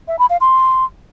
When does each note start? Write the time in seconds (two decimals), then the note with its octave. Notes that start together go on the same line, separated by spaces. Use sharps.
0.08 E5
0.19 B5
0.30 F5
0.41 C6